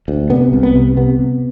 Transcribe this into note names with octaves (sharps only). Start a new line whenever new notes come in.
D2
C3 B3
C2
B3
C3
C3 B3
C3